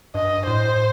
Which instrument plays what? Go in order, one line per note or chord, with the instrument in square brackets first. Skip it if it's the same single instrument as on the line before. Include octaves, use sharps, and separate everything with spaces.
[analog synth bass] G2 [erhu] D#5
[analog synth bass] A2 [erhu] C5